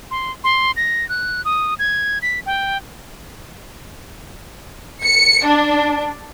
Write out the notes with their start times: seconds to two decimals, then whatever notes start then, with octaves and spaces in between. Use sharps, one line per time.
0.11 C6
0.44 C6
0.76 A#6
1.09 F#6
1.45 D#6
1.79 G#6
2.22 B6
2.46 G5
5.04 C#7
5.46 D4